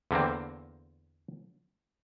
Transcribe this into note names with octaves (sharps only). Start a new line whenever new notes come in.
E2 D3 A#3 C4